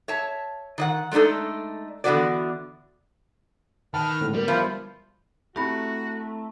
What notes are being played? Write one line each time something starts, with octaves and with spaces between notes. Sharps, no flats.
C#5 E5 A5
D#3 D#5 F#5
G#3 A3 D4 D#4 A4
D3 E3 B3 E4 F#4 D5
D#3 B4 A5 F6
A2 D3 G#3
G3 B3 A#4
F3 E4 C6
A3 C4 E4 F#4 G4 A#5 B5